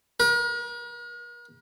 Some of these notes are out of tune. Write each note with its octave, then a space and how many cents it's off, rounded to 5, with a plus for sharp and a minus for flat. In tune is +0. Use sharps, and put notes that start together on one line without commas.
A#4 +45